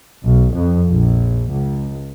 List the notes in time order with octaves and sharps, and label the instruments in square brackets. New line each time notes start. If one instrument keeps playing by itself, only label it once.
[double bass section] B1
F2
A#1
C#2